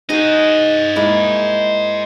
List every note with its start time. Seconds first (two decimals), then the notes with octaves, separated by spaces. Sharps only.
0.09 D#4 F#4 G#4 C5 D#5
0.96 G#3 A#3 E4